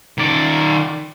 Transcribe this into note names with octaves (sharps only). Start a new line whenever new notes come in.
D#3 D5